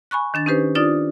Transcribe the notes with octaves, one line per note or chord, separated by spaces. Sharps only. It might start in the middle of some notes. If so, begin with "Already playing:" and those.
G#5 B5 C#6 F#6
D#3 D4 A6
C#4 D#4 G4 B4 C5
D4 D#4 F4 D5 D#6 A6